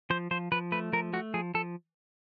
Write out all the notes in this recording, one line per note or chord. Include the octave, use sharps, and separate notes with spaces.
F3 C5
F3 C5
F3 B4
A3 B4
F3 A#4
A3 F#4
F3 G#4
F3 A4